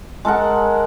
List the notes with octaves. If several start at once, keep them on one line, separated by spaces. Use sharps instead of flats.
G#3 A4 A#4 F#5